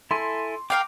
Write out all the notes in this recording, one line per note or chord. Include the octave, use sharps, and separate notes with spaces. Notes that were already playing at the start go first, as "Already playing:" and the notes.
E4 A4 G#5 C6
A#4 F5 G5 D6